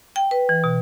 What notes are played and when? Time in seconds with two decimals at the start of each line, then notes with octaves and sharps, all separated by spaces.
0.16 G5
0.31 B4
0.49 E3
0.64 B2